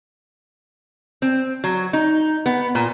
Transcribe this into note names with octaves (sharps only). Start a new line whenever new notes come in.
C4
F#3
D#4
B3
A#2